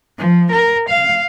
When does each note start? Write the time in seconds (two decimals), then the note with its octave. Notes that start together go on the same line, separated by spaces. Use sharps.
0.18 F3
0.51 A#4
0.89 F5